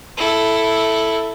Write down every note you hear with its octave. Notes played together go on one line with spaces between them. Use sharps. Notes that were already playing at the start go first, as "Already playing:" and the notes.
E4 A4